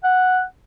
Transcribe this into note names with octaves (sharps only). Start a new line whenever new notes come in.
F#5